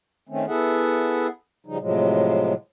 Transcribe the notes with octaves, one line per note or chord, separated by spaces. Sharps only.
D#3 A3 C4 C#4
B3 E4 G#4 A4 E5 F#5
C#3 F3 G3 D#4
A2 C3 F3 F#3 G#3